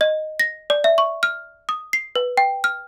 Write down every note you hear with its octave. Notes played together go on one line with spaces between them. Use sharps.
D#5
A#6
D5
E5
C#6
F6
D#6
C7
B4
G5
F6